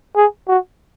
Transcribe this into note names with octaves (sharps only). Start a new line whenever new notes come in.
G#4
F#4